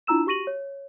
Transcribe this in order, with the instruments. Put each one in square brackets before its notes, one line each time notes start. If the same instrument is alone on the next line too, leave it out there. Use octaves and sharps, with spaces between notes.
[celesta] D4 E4 F4 A#5 E6 E7
F#4 G4 C#6 A#6 D#7 F#7
C#5